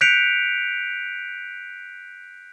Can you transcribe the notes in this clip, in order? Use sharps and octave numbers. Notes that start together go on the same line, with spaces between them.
F#6 G6 B6 C#7 D7 F7